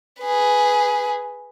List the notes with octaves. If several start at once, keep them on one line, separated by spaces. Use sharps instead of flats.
G#4 B4